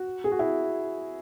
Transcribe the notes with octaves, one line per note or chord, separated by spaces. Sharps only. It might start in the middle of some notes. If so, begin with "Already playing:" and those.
Already playing: F#4
G#4
F#4
E4